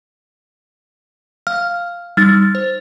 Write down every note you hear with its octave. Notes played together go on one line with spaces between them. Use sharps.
F5 F6
G3 D#4 E6 F6 A6
C5